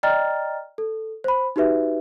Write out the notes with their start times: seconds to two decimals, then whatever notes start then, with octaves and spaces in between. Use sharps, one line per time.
0.03 D5 D#5 G5 A#5 F6 A6
0.78 A4
1.24 C5 B5
1.56 D#4 F#4 G4 B4 E5